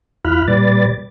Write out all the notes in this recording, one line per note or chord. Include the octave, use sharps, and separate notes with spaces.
E2 E4 F4 B5 F6 F#6
A#2 G3 B4 D5 A6